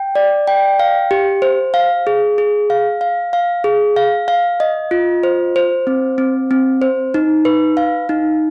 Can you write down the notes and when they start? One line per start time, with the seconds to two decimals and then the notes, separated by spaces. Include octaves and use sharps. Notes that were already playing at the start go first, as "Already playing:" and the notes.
Already playing: G5
0.15 D5
0.47 G5
0.80 F5
1.11 G4
1.42 C5
1.74 F5
2.07 G#4
2.38 G#4
2.70 F5
3.01 F5
3.33 F5
3.64 G#4
3.96 F5
4.28 F5
4.60 D#5
4.91 F4
5.23 C5
5.56 C5
5.87 C4
6.18 C4
6.51 C4
6.82 C5
7.14 D#4
7.45 B4
7.77 F5
8.09 D#4